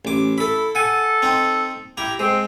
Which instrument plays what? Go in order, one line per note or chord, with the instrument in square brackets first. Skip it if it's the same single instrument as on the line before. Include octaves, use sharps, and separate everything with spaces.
[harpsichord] A1 D6
[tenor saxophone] E4 [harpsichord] A4 B5
[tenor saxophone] A4 [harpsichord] F#5 G#5
[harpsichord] C4 D#4
[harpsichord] E4 A#5 [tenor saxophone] G4
[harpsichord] G#3 [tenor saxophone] C4